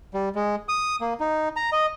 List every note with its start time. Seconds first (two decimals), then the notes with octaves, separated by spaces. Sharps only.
0.14 G3
0.35 G#3
0.69 D#6
1.01 A#3
1.20 D#4
1.56 A#5
1.72 D#5